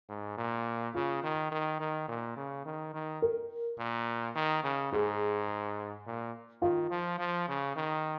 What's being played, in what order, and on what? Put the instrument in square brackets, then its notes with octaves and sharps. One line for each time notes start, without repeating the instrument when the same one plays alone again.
[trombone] G#2
A#2
[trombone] C#3 [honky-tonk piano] F4
[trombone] D#3
D#3
D#3
A#2
C#3
D#3
D#3
[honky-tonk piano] A#4
[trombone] A#2
D#3
C#3
[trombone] G#2 [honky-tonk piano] G#4
[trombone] A#2
[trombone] D#3 [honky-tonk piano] F4
[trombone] F3
F3
C#3
D#3